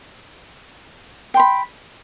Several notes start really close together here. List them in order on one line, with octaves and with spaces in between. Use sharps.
G5 C6 B5